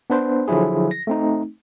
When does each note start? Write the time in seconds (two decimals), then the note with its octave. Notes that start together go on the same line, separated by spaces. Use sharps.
0.10 B3 D4 B4 C5
0.48 D3 F3 F#3 E4 G#4
0.91 A#6
1.07 A3 C4 D#4